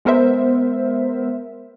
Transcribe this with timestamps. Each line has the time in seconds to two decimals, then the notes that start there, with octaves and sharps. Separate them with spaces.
0.05 G#3 B3 A#4 C5 E5